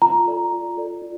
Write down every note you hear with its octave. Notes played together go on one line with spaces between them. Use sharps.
F4 A#5
A4 D5
F4
A4 D5
F4